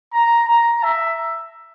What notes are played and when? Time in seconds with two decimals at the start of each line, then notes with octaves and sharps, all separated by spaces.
0.13 A#5
0.48 A#5
0.83 E5